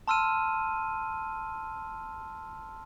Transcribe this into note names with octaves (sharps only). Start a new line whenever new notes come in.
A5 C6 E6 F6 D#7